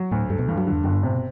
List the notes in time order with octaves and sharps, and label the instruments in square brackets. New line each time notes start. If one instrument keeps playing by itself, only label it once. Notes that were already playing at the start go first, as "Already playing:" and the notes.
Already playing: [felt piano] F#3
[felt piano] D2 [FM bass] A2
[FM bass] G2 [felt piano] A3
[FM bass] B2
[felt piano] G2 [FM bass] E3
[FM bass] F#3
[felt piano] D3
[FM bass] E2
[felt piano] G1 [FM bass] F#2
[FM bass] G2
[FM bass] A2 [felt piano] C3
[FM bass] B2